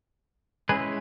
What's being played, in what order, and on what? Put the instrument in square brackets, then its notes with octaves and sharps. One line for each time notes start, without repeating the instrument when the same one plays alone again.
[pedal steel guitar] G#3 C#4 E4 G#4 B4